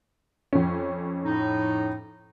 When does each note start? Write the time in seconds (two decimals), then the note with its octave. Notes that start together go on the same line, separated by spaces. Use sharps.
0.53 F2 C#4
1.24 A2 D#4